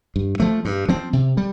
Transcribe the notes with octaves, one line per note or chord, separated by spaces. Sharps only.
G2
F3 A3
G2
F3 C4
C3
G3